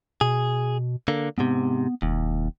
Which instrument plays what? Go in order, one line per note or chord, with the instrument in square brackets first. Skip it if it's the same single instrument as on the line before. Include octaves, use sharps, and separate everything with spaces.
[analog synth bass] B2 [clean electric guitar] G#4
[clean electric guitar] D3 A#3
[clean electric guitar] G#2 C3 [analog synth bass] B3
[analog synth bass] E1 [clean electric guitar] D#2